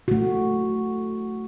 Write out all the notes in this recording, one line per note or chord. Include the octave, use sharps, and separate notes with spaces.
A3 F#4